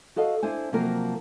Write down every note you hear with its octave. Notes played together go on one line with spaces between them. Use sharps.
F#4 A4 D#5 F5 F#5
D4 E4 C5 G#5
C3 F3 F#3 A#3 A#4